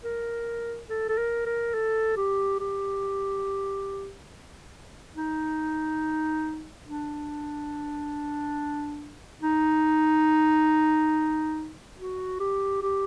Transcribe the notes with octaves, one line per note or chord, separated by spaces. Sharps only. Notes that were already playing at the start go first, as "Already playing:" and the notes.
A#4
A4
A4
A#4
A#4
A4
G4
G4
D#4
D4
D#4
F#4
G4
G4